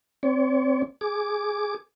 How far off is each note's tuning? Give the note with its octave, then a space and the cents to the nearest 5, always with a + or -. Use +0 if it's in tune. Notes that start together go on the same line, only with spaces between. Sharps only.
C4 +0 C#5 +45
G#4 +0 D6 +0